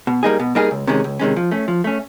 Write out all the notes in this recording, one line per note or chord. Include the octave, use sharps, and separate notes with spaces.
B2
G3 A#3 D#4 G#4
B2
G3 A#3 D#4 G#4
C#2
C3 D#3 G#3 C#4
C#2
C3 D#3 G#3 C#4
F3
A3 C#4
F3
A3 C#4